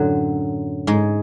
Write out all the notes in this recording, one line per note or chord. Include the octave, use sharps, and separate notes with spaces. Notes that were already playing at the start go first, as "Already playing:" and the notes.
Already playing: F#2 A2 D3 F#3
G#2 G#3